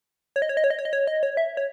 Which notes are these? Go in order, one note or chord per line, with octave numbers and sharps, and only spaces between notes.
C#5
D#5
C#5
D#5
C#5
D#5
C#5
D#5
C#5
D#5
C#5
E5
C#5